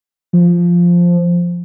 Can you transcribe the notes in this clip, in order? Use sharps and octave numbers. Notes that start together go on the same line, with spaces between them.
F3